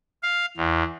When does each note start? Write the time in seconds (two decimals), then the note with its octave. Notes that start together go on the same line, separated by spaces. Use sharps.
0.23 F5
0.57 E2